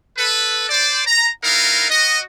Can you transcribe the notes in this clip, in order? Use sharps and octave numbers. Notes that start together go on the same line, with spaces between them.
A4 B4
C5 D5
A#5
B3 D#4 E4 A#4 F5
F#4 D#5